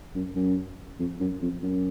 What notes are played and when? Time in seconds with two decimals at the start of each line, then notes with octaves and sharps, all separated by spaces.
0.15 F#2
0.36 F#2
0.99 F2
1.20 F#2
1.42 F2
1.63 F#2